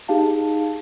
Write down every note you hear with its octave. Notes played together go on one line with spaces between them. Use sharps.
D#4 G4 G#4 F5 A5